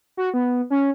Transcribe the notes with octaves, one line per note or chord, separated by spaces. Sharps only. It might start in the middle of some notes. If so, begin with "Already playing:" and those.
F#4
B3
C#4